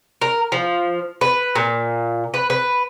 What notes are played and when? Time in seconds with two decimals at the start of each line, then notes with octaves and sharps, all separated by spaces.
0.22 A#4
0.52 F3
1.21 B4
1.55 A#2
2.34 B4
2.50 B4